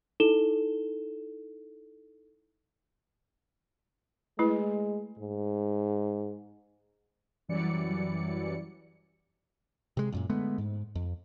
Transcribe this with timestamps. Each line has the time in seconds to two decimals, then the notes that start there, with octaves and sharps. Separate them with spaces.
0.20 D#4 E4 A4 E7 G7
4.39 G#3 A3 E4 B4
5.19 G#2
7.48 F#2 E3 F#3 G3 D5 C#7
9.97 C3 G#3
10.12 A1 F#2 A#2
10.29 D3 G#3 A3 B3
10.58 G#2
10.95 F2